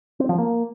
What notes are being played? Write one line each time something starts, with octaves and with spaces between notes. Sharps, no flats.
C4
F3
A#3